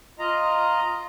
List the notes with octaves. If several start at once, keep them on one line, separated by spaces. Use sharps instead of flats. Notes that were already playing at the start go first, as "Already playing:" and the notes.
F4 D#5 A#5